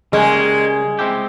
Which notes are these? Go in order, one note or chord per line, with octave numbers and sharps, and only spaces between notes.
C#3 G3 G#3 A#3 C#4
G#3 C4 E4 G4